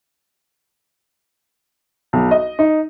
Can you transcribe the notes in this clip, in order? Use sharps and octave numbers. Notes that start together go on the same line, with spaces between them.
B1
D#5
D#4